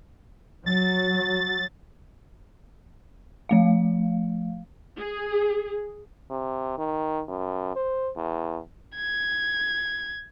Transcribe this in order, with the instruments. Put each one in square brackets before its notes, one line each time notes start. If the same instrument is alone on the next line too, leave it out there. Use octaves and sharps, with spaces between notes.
[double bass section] F#3 [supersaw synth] A6
[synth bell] F3 A3 F5
[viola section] G#4
[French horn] C3
D#3
F#2
C5
E2
[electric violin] G#6